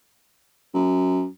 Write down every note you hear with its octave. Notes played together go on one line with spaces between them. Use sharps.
F#2